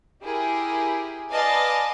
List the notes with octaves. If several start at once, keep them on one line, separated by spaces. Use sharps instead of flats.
E4 G4 G#4 A#4
B4 D5 D#5 F5 G#5 A5